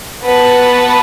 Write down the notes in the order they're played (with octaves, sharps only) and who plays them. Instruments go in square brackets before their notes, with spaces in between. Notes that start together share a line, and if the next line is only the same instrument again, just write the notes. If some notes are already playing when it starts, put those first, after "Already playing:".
[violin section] B3 F#4 B4 F#5 A5